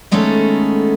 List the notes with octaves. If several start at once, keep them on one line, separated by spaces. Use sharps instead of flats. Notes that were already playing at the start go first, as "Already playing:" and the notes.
D#3 G#3 A3 B3 C#4 A4